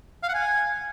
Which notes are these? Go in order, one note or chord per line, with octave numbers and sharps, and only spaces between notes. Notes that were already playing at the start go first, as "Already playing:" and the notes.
F5
F#5
G#5